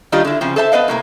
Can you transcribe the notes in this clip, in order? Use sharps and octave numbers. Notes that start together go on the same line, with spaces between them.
D#3 G3 D4 F4 G4 D#5
D3 E4
C#3 F3 C4
A4 C5 E5 A5
B3 B4 D#5 F5
A2 C3 A#3